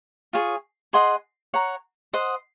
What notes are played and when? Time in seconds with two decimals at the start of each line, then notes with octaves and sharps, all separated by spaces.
0.33 F4 G#4 C#5
0.93 G#4 D#5 F#5 C6
1.54 C#5 F#5 A#5
2.13 C5 D#5 F#5